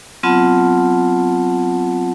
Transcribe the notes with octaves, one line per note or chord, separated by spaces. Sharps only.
F#3 B3 C4 F4 F#5 A5